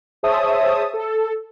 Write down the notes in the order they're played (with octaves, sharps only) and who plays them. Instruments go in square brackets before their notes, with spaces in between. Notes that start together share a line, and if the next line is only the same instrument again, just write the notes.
[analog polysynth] G#4 C5 C#5 E5 A5 D#6
A4